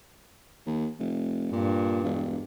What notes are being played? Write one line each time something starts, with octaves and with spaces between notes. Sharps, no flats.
D#2
F1
G2 A#2
E1